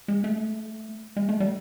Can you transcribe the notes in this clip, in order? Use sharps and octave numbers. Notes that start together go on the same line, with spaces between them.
G#3
A3
G#3
A3
G3